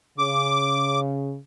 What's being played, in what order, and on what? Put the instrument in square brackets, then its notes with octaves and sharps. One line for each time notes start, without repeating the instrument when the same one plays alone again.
[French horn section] C#3 [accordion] D6